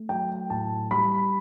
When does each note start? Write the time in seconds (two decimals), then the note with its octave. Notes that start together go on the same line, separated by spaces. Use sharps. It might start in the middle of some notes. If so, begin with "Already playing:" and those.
Already playing: A3
0.09 F#3 G5
0.50 A2 A5
0.91 G3 B5